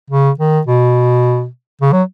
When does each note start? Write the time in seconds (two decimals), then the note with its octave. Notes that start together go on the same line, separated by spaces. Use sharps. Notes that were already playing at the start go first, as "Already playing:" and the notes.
0.10 C#3
0.40 D#3
0.67 B2
1.81 C#3
1.93 F#3